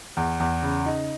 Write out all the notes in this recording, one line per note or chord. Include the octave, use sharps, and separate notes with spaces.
E2
E2
C#3
D#4